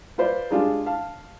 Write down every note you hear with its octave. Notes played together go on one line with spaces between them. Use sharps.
F4 B4 C5 D5
G#3 D4 F4 G4 G#4
F5 A5